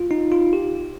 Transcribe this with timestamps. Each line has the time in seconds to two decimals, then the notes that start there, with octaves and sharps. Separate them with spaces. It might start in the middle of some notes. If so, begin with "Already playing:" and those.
Already playing: F4
0.11 D#4
0.32 F4
0.53 G4